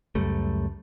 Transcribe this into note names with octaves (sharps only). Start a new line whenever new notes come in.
C#2 F#2 G3 A3